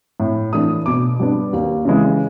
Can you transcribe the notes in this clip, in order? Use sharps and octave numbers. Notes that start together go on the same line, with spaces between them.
A2
E3 A3 D4 D#6
B2 D6
G3 B3 D4
D#2
C#3 E3 G#3